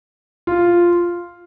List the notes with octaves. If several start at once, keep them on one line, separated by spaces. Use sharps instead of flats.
F4